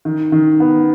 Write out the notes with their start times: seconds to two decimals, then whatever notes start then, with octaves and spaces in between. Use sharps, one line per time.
0.05 D#3
0.32 D#3
0.60 B3